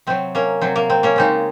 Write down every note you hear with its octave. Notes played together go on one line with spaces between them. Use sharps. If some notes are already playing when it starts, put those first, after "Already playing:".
C3 F#3 C4
A#3 C#4
C3 F#3 C4
A#3
C4
A#3 C#4
C#3 G#3 C4 D#4